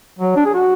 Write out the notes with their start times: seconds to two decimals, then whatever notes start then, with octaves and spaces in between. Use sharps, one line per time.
0.19 F#3
0.36 D4
0.45 G#4
0.54 F#4